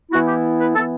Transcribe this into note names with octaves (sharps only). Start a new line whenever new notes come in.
E3 B3 E4 F#4
G4
B4
E3 B3 E4 A4